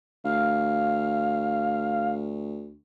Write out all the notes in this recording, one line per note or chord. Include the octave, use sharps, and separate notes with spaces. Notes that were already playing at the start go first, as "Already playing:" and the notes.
D2 F5